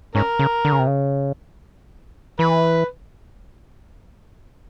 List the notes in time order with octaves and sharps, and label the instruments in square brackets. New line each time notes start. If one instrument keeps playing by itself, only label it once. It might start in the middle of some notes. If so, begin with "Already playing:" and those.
[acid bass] G#2 [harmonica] C#4 A#4
[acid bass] C#3
D3
C#3
C3
C#3
[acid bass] E3 [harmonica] B4